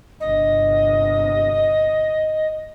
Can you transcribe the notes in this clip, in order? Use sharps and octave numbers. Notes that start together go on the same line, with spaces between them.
G1 C3 D#5